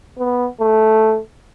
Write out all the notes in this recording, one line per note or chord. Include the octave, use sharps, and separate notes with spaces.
B3
A3